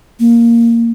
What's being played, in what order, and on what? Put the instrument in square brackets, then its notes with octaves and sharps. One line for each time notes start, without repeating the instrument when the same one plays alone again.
[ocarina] A#3